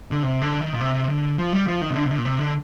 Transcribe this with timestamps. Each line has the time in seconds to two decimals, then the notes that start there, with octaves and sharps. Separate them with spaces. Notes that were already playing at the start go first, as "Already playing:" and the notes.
0.11 D3
0.23 C3
0.41 D3
0.61 D#3
0.73 A#2
0.80 C3
1.09 D3
1.38 F3
1.53 G3
1.67 F3
1.81 D#3
1.90 C3
1.96 D3
2.06 C3
2.11 D3
2.18 A#2
2.25 C3
2.39 D3